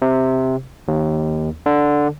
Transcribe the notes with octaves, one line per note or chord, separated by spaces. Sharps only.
C3
D#2
D3